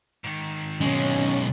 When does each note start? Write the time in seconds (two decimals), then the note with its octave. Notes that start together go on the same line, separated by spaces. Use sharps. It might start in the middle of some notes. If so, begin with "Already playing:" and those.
0.24 G#2 D#3
0.81 B1 G#3 C#4